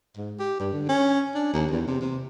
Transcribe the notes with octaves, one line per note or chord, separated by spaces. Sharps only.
G#2
G4
G2
D3
C#4
D4
D#2
E2
C3
C3